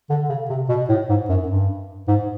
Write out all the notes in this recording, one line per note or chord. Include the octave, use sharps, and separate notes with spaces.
D3
C#3
C3
B2
A2
G#2
F#2
G2
G#2